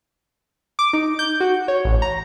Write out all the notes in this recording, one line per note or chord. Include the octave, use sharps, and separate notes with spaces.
D6
D#4
G6
F#4
C#5
A1
A#5